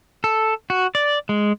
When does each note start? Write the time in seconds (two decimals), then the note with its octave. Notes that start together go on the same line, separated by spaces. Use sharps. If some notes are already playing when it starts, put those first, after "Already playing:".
0.24 A4
0.70 F#4
0.95 D5
1.29 G#3